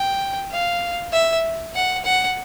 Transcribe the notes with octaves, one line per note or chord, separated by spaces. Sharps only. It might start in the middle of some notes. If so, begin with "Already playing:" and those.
Already playing: G5
F5
E5
F#5
F#5